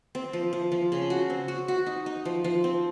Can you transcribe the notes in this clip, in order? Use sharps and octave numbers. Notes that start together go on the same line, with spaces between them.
C4
F3
F3
F3
C#3
F#4
C4
F#4
F#4
D#4
D#4
F3
F3
C4